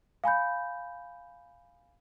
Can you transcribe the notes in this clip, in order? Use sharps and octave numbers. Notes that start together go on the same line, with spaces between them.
F5 G#5 B5 G6